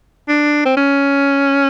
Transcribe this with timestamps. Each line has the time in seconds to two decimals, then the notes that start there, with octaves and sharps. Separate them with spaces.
0.29 D4
0.65 C4
0.77 C#4